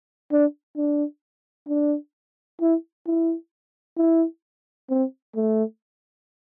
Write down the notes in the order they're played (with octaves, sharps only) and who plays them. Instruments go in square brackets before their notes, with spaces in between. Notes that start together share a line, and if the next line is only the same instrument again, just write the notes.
[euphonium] D4
D4
D4
E4
E4
E4
C4
A3